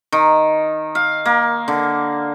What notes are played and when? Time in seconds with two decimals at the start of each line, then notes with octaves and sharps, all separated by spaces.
0.12 D#3
0.95 F5
1.26 A#3
1.68 D3